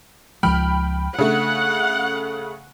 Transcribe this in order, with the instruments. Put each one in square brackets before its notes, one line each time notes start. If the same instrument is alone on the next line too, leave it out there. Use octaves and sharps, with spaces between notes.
[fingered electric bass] C#2 F3 G#3 [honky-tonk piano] G5 B5 F6
[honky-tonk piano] C#3 A3 [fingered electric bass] D4 [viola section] F#5